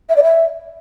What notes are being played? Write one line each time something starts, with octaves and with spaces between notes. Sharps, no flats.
E5
D5
E5